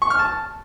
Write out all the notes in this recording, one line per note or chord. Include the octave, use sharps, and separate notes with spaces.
C#6
F6
A5